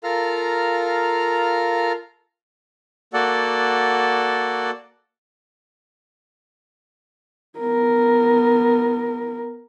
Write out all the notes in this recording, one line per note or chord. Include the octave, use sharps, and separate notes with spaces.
F4 A4 A#4 F5 A#5 F6
A#3 F#4 A4 D5 F#5
B3 A#4